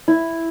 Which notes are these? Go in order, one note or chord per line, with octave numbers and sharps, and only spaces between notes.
E4